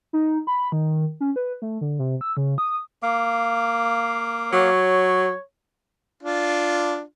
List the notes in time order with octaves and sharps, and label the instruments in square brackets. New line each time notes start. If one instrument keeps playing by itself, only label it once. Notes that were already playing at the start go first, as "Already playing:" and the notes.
[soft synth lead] D#4
B5
D#3
C#4
B4
A3
D3
C3
E6
C#3
D#6
[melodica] A#3 F5 D6
[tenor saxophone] F#3 [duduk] C#5
[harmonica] D4 F4